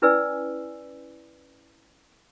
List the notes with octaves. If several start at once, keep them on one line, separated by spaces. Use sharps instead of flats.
C#4 E4 B4 D5 G#5 E6